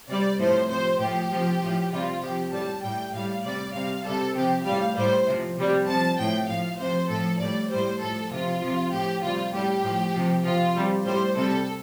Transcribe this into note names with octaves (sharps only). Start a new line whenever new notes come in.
C3 G3 D5
A2 F3 C5
C3 F3 C5
A2 F3 G4
C3 F3
A2 F3
C3 G3 F4
C3 F3 G4
A2 G3 A5
A2 G3 G5
A2 G3 F5
C3 G3 D5
C3 G3 F5
C3 G3 A4
C3 F3 G4
A2 G3 F5
A2 G3 C5
C3 F3
C3 G3
C3 F3 A5
A2 F3 G5
A2 F3 F5
C3 F3 C5
A2 F3 A4
A2 G3 D5
A2 G3 C5
A2 F3 A4
C3 F3 F4
C3 F3
A2 F3 G4
C3 G3 F4
A2 G3 G4
A2 F3
C3 F3
C3 F3 F4
C3 G3
A2 G3 C5
C3 G3 A4